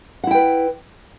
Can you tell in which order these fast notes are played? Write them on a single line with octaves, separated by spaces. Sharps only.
F#5 E4 G5 B4